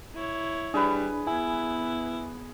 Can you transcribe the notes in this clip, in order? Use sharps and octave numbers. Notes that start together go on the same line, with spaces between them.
E4 C#5
G3 D4 G#4 B4
B3 E4 G#5